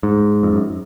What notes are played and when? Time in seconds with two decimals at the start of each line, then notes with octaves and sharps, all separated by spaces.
0.03 G#2
0.43 F2
0.53 F#2